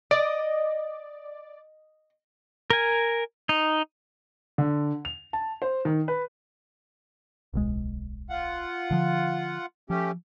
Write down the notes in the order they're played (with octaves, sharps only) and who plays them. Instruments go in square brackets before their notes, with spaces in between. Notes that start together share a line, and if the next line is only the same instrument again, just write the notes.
[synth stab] D5 [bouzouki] D#5
[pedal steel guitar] A#4 G#5
D#4
[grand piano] D3
F7
A5
C5
D#3
B4
[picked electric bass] D1 B1 G#3
[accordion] F4 F#5
[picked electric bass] D3 F3
[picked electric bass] F3 [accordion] A3 C#4 G4